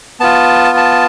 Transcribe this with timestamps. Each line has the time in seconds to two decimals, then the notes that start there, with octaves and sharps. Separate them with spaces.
0.20 B3 F4 A5
0.77 A5